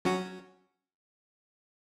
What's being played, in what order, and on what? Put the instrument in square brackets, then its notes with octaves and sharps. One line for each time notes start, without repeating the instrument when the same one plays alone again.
[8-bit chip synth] F#3 C#4 F#4